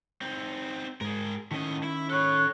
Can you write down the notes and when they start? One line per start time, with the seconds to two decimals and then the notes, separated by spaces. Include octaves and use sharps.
0.21 C4 D#4
1.01 G#2 G#4 A#4
1.51 A2 D#3 C#4 D#5
1.83 E4
2.10 A4 C#5 B5 F#6